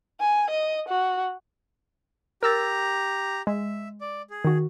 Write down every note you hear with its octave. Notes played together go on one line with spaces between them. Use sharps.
G#5
D#5
F#4
G4 A#4 A#5 E6 A6
G#3 E5
D5
G#4
D#3 F#4